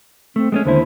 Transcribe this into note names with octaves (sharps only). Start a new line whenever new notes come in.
A3 C4
G#3 A3 B3 C#4
D#2 D3 E4 C5